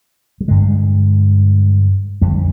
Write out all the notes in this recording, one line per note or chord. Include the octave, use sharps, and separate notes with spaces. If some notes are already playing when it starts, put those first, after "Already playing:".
G3
G2 D3 G#3
F2 D3 G3